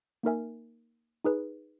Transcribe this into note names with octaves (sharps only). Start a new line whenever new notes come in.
A#3 D#4 A#4 E5 G#5
D#4 G#4 B4